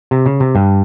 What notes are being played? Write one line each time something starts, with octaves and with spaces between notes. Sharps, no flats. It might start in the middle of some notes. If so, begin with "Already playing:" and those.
C3
C#3
C3
G2